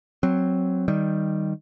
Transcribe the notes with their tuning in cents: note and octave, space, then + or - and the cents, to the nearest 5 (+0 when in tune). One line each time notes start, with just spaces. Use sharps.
F#3 +0 C4 +0
D#3 +0 G3 +0